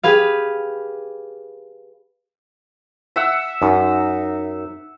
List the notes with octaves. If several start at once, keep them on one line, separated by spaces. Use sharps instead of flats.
G4 G#4 B4 F5
E5 F#5 E6
F#2 D#4